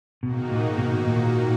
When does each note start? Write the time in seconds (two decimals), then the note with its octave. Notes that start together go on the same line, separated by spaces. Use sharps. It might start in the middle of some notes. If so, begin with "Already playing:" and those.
0.23 G#2 B2 D#3 A#3 D#4 F#4
0.51 A#2
0.78 B2
1.07 A#2